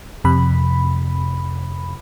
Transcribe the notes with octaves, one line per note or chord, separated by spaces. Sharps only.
F2 C3 B5